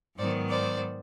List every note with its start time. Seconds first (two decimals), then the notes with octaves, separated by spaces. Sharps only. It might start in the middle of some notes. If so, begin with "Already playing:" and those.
0.17 G#2 D#3 F#3 B3 C5 D5
0.48 C5 D5